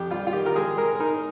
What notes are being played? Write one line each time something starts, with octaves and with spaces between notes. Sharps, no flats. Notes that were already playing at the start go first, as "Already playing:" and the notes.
Already playing: F2 G4
G3 F4
F4
D#3 G4
A#4
G#3 G#4
G#3 A#4
D#4 A#4